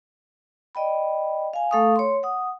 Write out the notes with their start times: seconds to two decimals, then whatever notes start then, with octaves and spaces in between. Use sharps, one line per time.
0.75 D5 D#5 G5 B5
1.53 F5 G#5
1.71 A3 A4 F5 C#6 D#6
1.96 C#5 C6
2.23 F#5 D#6